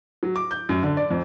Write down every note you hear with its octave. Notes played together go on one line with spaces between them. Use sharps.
F#3
D6
G6
F#2
D3
D5
F2